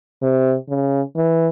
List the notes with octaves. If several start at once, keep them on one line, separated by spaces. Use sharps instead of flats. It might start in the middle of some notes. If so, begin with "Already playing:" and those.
C3
C#3
E3